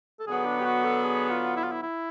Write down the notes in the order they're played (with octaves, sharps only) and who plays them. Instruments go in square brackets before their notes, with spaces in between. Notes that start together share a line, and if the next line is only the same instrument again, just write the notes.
[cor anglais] A4
[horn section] D3 F#3 B3 [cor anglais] G#4
[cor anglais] D4
G4
F#4
A4
G#4
F4
E4
F4
E4
E4